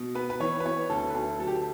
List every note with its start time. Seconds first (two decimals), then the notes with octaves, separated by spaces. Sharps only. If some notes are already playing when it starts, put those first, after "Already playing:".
Already playing: B2
0.15 B3 B4
0.30 B4
0.40 E3 C#5
0.60 B4
0.65 B3 C#5
0.89 D2 A4
1.10 B4
1.15 D2 A4
1.39 F#3 A4
1.47 G4
1.55 A4